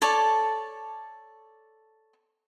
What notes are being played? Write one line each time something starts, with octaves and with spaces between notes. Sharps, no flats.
A4 C#5 D5 A5